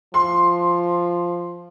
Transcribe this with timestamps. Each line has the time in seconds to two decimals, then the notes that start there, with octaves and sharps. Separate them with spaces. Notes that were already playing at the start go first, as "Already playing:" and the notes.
0.14 F3 C6